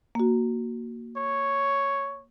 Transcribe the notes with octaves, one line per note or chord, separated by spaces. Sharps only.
A#3 F#4
C#5